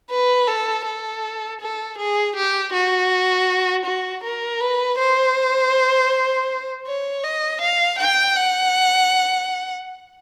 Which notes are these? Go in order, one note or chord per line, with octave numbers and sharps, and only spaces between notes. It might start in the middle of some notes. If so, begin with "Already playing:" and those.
B4
A4
A4
A4
G#4
G4
F#4
F#4
A#4
B4
C5
C#5
D#5
F5
G5
F#5